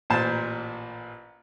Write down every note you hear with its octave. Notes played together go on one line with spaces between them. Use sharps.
A1 A#2 C5 A5